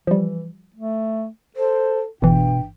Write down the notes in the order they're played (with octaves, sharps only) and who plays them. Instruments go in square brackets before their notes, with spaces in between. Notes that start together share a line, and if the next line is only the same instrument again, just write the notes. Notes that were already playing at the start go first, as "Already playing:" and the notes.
[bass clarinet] E3 [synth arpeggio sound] F3 G3
[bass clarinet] A3
[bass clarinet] A4 [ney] C5
[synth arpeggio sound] G1 E3 [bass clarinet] G2 [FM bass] B2 [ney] G5